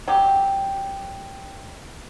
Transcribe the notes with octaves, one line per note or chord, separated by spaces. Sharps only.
F#3 G4